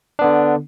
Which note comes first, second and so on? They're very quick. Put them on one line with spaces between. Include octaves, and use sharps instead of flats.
D4 B3 D3